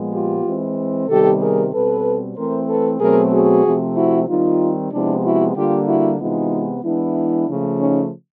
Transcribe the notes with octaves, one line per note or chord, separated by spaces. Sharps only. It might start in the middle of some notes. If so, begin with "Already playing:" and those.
Already playing: A#2 F3 G#3 B3
F4 G4
E3 G#3 C4
C3 D#3 G3 B3 G4 A4
G#4 A#4
B2 G3 C4 A4 B4
E3 A3 C4 A#4 C5
A4 B4
B2 F#3 A3 C4 G#4 A#4
F#4 G#4
C3 F3 A3 C4
E4 F#4
D#3 G3 C4 D#4 F4
C3 F3 G#3 B3 D4 E4
E4 F#4
D3 G3 A#3 F4 G4
E4 F#4
C3 E3 G#3 B3 D#4 F4
E3 G#3 B3 D4 E4
C#3 F3 A3
C#4 D#4